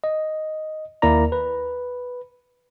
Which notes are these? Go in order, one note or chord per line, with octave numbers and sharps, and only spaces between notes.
D#5
D#2 A#3 E4 A#4 D5 A#5
B4